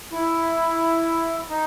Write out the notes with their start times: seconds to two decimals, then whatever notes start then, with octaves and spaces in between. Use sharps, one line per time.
0.12 E4
1.49 D#4